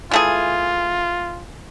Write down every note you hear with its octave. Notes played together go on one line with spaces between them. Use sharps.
E3 A3 F4 G#4